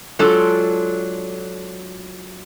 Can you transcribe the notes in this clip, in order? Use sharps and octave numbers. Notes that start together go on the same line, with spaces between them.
F#3 G#3 D4 F4 A4